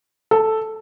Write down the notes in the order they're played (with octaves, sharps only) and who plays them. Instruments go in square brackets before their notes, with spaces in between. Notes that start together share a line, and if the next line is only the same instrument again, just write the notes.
[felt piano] A4